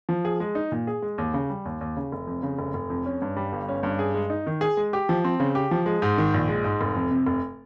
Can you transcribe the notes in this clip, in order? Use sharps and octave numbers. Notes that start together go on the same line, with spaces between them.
F3
G#4
G#3
D#4
A#2
G#4
G#3
D#2
C#3
G3
D#2
D#2
C#3
F1
F2
C#3
F1
F1
F2
C#4
G2
G3
G1
C#4
G2
G#4
G#3
D#4
D#3
G#4
G#3
G4
F3
C4
C#3
G4
F3
G#3
G#2
D#3
A#1
G#3
G#2
F1
F2
C3
F1